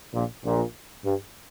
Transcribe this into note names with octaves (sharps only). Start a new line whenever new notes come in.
A#1 A#2
A#1 A#2
G2